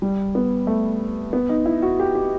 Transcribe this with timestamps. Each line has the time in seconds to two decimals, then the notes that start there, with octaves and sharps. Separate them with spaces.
0.02 G3
0.35 B3
0.67 A3
1.33 B3
1.49 D#4
1.66 E4
1.82 F#4
2.00 G4
2.15 G4